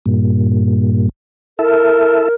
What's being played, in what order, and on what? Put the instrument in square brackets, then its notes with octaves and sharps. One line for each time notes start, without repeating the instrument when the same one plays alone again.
[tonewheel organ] G2 A#2
[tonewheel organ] E4 A4 E5 [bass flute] A#4